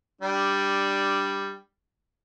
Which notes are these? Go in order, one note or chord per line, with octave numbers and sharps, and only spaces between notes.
G3 D4